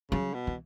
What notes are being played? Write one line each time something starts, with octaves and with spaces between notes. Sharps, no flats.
C#3 F#3
B2
E3